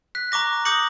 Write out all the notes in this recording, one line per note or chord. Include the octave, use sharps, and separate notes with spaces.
F#6 B6
A#5 C#6 D6 A#6
D6 D#6 G6 A#6 C#7 F#7